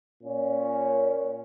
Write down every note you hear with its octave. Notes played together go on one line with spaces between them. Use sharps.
A#2 C#4